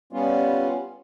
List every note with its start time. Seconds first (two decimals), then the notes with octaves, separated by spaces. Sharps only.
0.13 G3 B3 C#4 F4